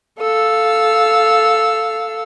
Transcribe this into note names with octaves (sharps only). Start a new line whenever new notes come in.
A4 F5 E6